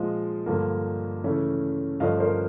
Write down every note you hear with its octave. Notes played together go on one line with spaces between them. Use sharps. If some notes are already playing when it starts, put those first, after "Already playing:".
Already playing: A#2 F3 G#3 D#5 F5
G2 D3 F3 A#3
C#3 E3 A3 C#4
G2 D3 F3 A3 C#4 D#5 F5
A#4 C5